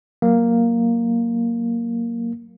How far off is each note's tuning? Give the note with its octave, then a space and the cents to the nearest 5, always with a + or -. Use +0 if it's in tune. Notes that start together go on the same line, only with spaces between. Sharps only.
F#3 +0 A#3 +0